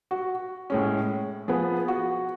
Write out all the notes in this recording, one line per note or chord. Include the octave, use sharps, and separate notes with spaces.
F#4
A2 G#3 C#4
F3 B3 G#4
F#4